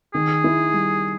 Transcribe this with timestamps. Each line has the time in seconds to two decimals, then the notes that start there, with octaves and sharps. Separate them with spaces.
0.14 D#3 G#4
0.44 E4
0.73 G3